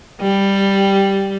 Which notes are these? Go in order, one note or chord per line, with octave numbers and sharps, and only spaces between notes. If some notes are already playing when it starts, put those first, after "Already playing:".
G3